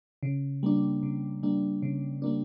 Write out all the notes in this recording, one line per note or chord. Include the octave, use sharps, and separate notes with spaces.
C#3
G3 A#3 D4
C#3
G3 A#3 D4
C#3
G3 A#3 D4